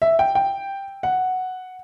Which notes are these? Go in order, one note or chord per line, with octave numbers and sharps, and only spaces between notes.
E5
G5
G5
F#5